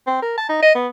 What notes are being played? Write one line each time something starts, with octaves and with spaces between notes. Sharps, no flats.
C4
A#4
A5
D#4
D#5
B3